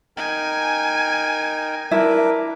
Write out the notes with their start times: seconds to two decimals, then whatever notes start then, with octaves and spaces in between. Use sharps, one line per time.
0.17 D#4 A#4 G5 G#5
1.91 D4 E4 A#4 B4 D6